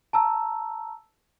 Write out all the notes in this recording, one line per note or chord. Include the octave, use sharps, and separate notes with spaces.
A5 A#5 E6